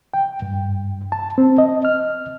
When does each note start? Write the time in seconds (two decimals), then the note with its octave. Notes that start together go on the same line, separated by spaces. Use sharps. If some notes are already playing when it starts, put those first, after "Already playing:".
0.14 G5
0.42 G2
1.12 A5
1.38 C4
1.58 D#5
1.85 F6